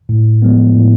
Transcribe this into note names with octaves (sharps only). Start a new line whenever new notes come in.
A2
F3 G#3 B3
A2